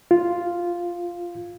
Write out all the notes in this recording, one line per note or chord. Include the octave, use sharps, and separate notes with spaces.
F4